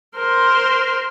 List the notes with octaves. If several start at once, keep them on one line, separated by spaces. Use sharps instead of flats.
A#4 C5